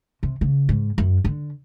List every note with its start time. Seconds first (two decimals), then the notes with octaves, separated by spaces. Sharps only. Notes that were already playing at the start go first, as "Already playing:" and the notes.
0.23 C3
0.41 C#3
0.69 G#2
0.98 F#2
1.25 D3